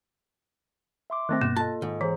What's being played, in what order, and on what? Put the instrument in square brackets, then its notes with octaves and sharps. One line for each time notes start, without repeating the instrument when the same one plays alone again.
[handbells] E5 C6 D6
[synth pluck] D#3 A3 C4 [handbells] F#6 A6 A#6
[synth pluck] G2 B2 [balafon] A#3
[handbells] F4 A4 D#5 [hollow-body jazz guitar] A5
[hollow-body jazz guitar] G#2 [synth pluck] D#3
[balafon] E3 [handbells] G#4 C5 A#5